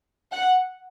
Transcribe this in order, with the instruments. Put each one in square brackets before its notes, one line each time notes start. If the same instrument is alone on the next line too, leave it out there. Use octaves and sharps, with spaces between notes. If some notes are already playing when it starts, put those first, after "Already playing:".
[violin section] F#5